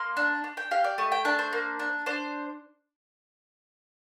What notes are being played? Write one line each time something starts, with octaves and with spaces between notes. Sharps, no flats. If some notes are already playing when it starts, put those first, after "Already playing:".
Already playing: A#3 C6
D4
D4
G5
G4 F5
D5
A3 D#5
G5
D4 A5
C5
A#3
D4
D4 C5